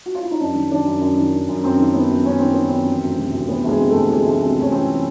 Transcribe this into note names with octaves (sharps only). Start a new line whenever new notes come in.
F#4
F4
E4
D#4
F#2 D4
D#3
D#3 D4
F#2
F#2
D#3
D#3
F#2
F#2 C4
D#3
D#3 B3
F#2
F#2 C#4
D#3 C4
D#3 B3
F#2 C4
E3
D2
C3
D2
E3 B3
D2 G#3
C3
D2 A3
E3 G#3
D2
C3
D2 C#4
E3 C4